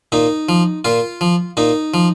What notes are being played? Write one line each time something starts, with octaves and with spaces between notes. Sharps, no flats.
A#2 D#4
F3
A#2 F4
F3
A#2 D#4
F3